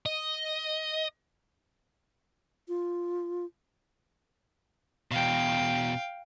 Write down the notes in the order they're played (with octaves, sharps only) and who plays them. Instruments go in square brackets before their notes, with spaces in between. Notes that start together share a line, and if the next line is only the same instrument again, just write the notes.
[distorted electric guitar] D#5
[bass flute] F4
[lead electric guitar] E2 B2 [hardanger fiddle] F5 G5